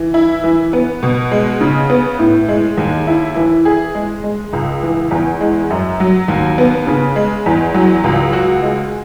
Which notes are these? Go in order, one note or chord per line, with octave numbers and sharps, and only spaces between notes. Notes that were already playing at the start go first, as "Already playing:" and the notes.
Already playing: E3
E4
E3
B3
B2
G#3
C#3
B3
A2
G#3
D#2
E4
E3
G#4
G#3
G#3
C#2
E3
E2
G#3
F#2
F#3
D#2
B3
C#3
G#3
E2
F#3
C#2
F#4
G#3